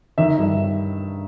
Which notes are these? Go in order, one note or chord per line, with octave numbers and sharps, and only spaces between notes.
D#3 E5
G2